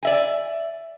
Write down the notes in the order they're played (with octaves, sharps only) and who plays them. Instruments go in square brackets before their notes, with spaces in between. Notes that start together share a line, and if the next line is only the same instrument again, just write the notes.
[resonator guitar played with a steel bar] D5 E5 G#5